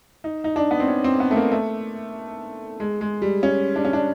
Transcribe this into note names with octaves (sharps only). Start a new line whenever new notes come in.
D#4
D#4
D4
B3
C4
C#4
C4
B3
A3
A#3
A3
G#3
G#3
G3
C#4
D4
C#4
D4